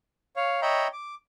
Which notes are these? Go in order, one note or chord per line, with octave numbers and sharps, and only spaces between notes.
C#5 F5
C#5 D#5 E5 G5 A#5 B5
D6